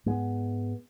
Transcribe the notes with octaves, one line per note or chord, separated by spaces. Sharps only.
G#2 G#3 B3